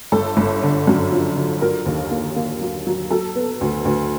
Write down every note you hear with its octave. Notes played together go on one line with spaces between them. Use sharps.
G1 A4
G1
D3
F#2
F3
D3
F#3 A#4
D#2
A#3
A#3
F#3
F#3
F#3 A4
B3
D2
D2